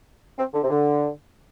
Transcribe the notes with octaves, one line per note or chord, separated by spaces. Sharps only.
C4
D3
C3
D3